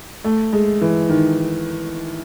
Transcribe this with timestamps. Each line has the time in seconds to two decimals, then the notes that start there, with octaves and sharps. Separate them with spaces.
0.25 A3
0.53 G#3
0.81 E3
1.09 D#3